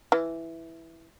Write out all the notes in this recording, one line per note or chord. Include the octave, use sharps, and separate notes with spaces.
E3